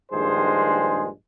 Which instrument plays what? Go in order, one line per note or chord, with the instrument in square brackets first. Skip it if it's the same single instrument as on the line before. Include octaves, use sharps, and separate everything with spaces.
[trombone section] A#1 G2 D#3 G#3 G#4 C5